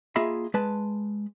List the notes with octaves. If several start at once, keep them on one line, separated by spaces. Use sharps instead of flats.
A#3 F4 G#4 D#5 E5 B5
G#3 B4 A5